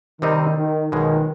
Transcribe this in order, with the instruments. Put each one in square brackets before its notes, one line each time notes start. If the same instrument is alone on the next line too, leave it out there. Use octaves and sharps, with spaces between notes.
[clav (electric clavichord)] C3 G3 C4 D#4 [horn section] D#3
[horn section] D#3
[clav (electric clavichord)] B1 B2 G#3 [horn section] D#3